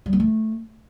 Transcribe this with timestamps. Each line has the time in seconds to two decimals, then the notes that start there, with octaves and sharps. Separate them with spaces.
0.06 G3
0.13 B3
0.20 A3